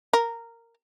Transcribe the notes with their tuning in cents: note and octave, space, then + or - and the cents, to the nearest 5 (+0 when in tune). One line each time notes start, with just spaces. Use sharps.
A#4 -10